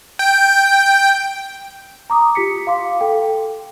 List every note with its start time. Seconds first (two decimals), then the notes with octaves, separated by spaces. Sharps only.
0.19 G5
2.10 A#5 D6 D#6
2.35 F4 G4 B6 C#7
2.67 F5 C6 D6
3.01 A4 G5